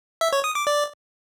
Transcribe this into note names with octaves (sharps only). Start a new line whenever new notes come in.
E5
C#5
D#6
D6
D5